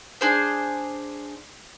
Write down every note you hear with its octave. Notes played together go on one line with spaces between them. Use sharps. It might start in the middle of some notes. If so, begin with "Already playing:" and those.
D4 G#4 C5